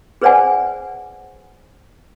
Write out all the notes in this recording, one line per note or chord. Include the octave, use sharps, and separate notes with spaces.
G#4 B4 C5 D5 F#5 G#5